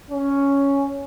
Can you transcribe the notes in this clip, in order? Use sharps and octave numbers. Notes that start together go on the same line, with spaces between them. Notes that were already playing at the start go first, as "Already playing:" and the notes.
C#4